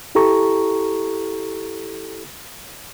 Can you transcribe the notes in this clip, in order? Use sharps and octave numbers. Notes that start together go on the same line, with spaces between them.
E4 G4 A4 A#5 C#6